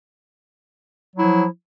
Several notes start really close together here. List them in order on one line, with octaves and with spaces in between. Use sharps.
F#3 E4 F3